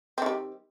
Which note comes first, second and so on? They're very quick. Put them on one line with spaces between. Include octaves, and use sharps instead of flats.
C4 D#3 G3